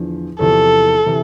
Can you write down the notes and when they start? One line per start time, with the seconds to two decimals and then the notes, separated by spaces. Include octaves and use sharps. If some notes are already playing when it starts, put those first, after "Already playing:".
Already playing: E2 D3 F3
0.40 E2 C3 F3 A4
1.06 C3 E3